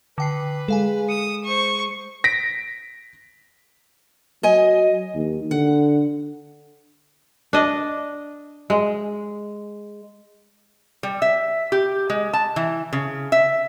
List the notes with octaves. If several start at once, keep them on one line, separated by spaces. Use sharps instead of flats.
D3 B4 G5 C7
G#3 A4 F5 G#5
D#6 C#7 D#7 E7
C5 C#6
A#6 B6 D7
F#3 D#5 G#5
D#2
D3 F#5
D4 D#5
G#3
G3
E5
G4
G#3
A5
E3
C#3
E5